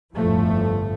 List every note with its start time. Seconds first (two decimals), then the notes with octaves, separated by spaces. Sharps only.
0.15 G1 F2 A2 F3 A3